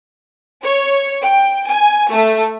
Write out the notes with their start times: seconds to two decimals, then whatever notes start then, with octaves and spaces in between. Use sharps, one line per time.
0.64 C#5
1.24 G5
1.71 G#5
2.10 A3